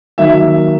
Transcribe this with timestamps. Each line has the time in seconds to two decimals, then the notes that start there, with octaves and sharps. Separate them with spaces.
0.18 D#3 F#3 A#3 E5